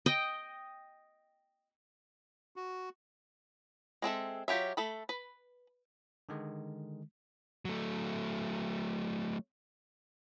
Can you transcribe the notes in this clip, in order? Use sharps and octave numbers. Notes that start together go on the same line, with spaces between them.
D#5 G5
F#4
G#3 C4 A4 E5
F#3 F4 G4 C#5 E5
A3 A4 B5
B4
D3 D#3 G#3
F#3 A3